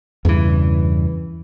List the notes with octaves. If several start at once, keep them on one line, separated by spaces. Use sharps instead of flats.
E2 G2 C#3 E3